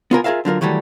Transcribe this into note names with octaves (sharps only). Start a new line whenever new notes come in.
B3 F4 A#4 G#5
F4 G#4 A#4 E5 F5
D3 F#3 F4 A#4
D#3 E3 F#3 G3 A3